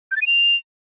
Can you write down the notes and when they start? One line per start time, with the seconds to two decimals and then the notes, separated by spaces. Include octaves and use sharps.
0.11 G6
0.16 A6
0.22 D#7
0.27 F7